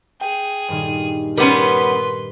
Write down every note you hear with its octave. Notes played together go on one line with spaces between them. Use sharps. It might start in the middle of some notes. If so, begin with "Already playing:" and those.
G#4 G5
G2 A#2 D#3
G3 B3 C#4 A#4 B4 C6